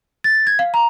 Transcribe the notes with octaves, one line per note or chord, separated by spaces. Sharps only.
A6
G#6
F5
A#5